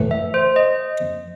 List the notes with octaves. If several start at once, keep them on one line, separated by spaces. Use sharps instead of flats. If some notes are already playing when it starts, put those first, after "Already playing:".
Already playing: A2 E3
E5
C5
D#5